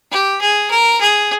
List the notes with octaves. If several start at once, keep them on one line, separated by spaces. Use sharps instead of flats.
G4
G#4
A#4
G#4